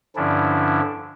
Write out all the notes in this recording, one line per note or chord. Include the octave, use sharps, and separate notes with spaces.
G2 D3 F3 C#4 D4 E4